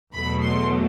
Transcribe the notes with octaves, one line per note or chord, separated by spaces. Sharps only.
E2 B2 F#3 A3 B5
C6